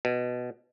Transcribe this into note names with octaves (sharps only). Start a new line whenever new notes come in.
B2